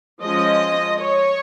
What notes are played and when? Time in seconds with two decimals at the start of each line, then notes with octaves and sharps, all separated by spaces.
0.22 F3 G#3 C#4 D#5
1.00 C#5